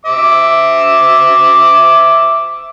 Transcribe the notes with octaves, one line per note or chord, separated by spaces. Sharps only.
E5 D6